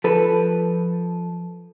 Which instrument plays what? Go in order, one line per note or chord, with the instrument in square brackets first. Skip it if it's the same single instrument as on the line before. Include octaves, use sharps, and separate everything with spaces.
[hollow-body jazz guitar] F3 A4 B4